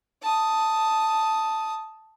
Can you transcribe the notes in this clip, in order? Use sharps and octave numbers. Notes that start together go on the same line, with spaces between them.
A5 D#6